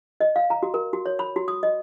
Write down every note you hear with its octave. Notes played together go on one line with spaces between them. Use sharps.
D#5
F5
A#5
F#4
A#4
F#4
C#5
B5
F#4
D#6
D#5